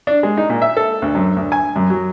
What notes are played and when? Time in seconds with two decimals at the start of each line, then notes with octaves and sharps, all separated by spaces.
0.07 D4
0.23 G#3
0.37 D#4
0.50 A#2
0.62 E5
0.77 A4
1.02 D2
1.15 F#2
1.36 D2
1.52 G#5
1.76 F#2
1.90 F#3